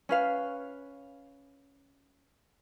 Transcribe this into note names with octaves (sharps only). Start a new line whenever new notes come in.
C#4 B4 F5